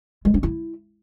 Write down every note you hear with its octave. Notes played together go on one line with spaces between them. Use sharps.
G#3
D4
E4